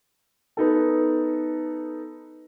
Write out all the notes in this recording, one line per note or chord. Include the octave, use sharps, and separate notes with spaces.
B3 D#4 A4